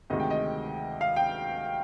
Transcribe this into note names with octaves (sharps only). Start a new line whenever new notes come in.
D2 C3 D#3 G#3 D#5
G5
D#5
F5
G5